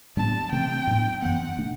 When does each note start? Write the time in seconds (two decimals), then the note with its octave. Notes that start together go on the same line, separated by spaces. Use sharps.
0.17 A2 G3 B3 D4 A5
0.52 C3 E3 A3 C4 G5
0.87 A2 F#3 B3 D4
1.22 F#2 E3 B3 F#5
1.58 B2 A3 D4